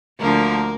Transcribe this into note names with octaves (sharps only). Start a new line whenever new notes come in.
D2 D3 F3 A#3 A#4